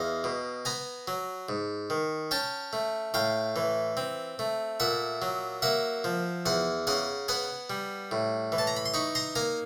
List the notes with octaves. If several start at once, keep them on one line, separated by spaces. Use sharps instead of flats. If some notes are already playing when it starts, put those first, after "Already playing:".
Already playing: E2 D#5 F5
B2
B3 G#5 A#5
F#3
G#2
D#3
C#4 G5 A5
A3
A2 F5 G5
E3
C4
A3
A#2 E5 F#5
F#3
A#3 E5 F#5
F3
E2 F#5 G#5
C#3 F#5 G#5
B3 F#5 G#5
G3
A2
E3
A5
A#5
B5
C6
D#4 B5 C#6
A#5 C6
A#3 G#5 A#5